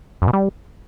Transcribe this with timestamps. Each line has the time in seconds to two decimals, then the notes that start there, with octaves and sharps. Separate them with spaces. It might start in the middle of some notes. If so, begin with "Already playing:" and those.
0.22 F#2
0.28 B2
0.33 G3